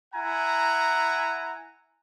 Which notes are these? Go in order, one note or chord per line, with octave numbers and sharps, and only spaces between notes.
E4 F#5 G#5 A#5